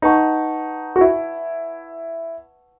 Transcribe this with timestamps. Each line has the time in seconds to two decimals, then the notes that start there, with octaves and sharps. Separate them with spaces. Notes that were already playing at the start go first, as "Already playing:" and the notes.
0.02 D#4 B4 F#5 A5 C#6
0.96 F#4
1.01 E4